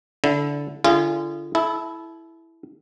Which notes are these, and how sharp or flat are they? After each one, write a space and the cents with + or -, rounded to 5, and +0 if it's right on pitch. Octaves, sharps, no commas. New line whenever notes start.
D3 -20 E4 +0
D3 +0 F4 -35 G#4 -20
E4 +0 A4 -35